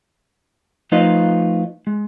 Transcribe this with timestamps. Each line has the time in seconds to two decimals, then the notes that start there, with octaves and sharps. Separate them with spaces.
0.92 F3 A3 D#4 F4 B4 D#5
1.87 G#3